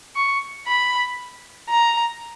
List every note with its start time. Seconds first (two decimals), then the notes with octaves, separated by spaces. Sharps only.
0.16 C#6
0.67 B5
1.69 A#5